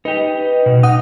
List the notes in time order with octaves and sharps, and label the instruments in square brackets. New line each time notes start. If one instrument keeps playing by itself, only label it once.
[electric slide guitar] D#4 G4 [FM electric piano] B4
[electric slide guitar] B2
[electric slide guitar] D#4 [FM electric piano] F#5 D#6